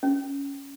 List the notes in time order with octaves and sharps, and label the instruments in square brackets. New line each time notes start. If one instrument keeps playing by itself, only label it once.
[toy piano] C#4